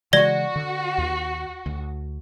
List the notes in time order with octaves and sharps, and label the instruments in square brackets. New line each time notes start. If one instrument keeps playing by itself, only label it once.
[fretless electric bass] C#3 E3 G#3 [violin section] F#4 [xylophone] D5 A#6 G7
[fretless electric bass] D3
D#2
D2